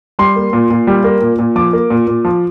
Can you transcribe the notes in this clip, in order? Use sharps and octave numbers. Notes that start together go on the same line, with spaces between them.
G3 C6
A#3
A#2
A#2
G3
A#3
A#2
A#2
F3 D6
A#3
A#2
A#2
F3